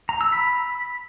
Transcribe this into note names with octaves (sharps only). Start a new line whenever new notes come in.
A#5
E6
B5